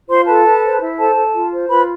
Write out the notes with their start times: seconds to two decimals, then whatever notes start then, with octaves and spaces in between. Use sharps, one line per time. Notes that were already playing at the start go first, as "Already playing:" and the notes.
0.09 F4 C5 C6
0.27 A4 B4 A5
0.45 B4
0.63 C5
0.81 E4
0.98 A4 C5 A5
1.16 A4
1.34 F4
1.52 C5
1.69 F4 B4 B5